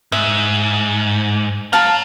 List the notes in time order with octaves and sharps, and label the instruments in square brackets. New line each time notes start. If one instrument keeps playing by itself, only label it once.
[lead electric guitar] G#2 [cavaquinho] E5
[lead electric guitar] C#5 A#5 [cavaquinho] F5 A5